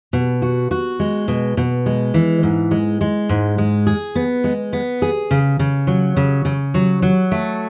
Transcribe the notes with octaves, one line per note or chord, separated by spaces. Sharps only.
B2
F#4
F#4
G#3
B2
B2
G#3
E3
G#2
G#3
G#3
G#2
G#3
G#4
B3
G#3
B3
G#4
C#3
C#3
F#3
C#3
C#3
F#3
F#3
A3